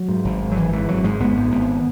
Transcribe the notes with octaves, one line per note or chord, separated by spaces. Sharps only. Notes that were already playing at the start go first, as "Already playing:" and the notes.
Already playing: F#3
G#2
G#1
G#2
F#3
G#1 E3
G#2 E3
G#1 F#3
G#2 G#3
G#1 B3
G#2
G#1